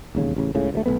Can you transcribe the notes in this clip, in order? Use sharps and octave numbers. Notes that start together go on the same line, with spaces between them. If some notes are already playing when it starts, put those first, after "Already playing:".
E1 D#2 C#3
A1 C#3
C#2 A2 C#3
D2 D3 A3
B1 G2 A3 B3